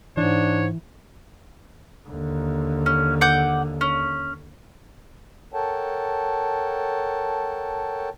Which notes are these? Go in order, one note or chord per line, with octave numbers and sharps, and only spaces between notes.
G#2 E3 D4 C#5
D#2 D3
C#4
F#5 D6 G6
C#4
A4 A#4 C#5 F#5 G5 A5